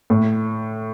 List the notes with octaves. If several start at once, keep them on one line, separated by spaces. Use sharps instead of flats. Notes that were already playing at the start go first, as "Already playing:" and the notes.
A2